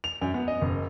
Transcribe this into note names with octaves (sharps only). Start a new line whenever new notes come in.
F7
F#2
B3
D#5
F#1